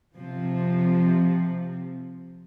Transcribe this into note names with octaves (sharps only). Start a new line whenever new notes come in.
C3 F3